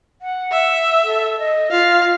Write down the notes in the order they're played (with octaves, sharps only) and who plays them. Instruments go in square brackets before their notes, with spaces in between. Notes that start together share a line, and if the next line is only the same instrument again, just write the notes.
[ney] F#5
[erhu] E5
[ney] A4
D#5
[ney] F4 [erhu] F5